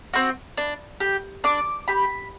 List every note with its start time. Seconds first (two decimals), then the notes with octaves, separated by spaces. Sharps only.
0.14 C4 F#4
0.57 D4
1.00 G4
1.44 D4 D6
1.88 G4 B5